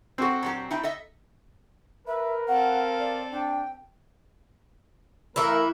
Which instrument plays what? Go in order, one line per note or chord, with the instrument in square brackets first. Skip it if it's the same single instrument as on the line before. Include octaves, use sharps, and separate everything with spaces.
[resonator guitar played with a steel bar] G#2 A4 [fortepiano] C4 F#4
[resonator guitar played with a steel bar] A#2 F#3 G4
D#4 E4 G5
A4 D#5 E5
[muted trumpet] A#4 [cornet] B4 [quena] E5
[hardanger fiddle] C4 A4 [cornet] F5 [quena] F#5
[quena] D5
[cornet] D4 [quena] G5
[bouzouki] E3 E4 [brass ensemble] A3 A#4